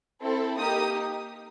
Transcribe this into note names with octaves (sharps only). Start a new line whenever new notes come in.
C4 E4 A4
A#3 D#4 G4 D#6